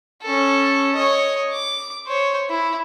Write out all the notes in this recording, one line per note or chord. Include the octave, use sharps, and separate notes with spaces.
C#4 A4
C#5 D#5
D6
C5 C#5
E4